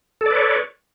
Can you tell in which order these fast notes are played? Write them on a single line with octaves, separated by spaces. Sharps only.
A4 D5 B4 C#5